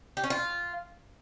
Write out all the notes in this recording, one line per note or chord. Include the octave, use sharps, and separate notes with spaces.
G4
C#4
F4